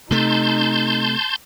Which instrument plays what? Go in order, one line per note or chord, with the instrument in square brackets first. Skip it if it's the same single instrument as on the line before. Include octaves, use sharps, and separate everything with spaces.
[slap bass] C3 A3 [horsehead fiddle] D#4 [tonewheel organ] A5 C6 G6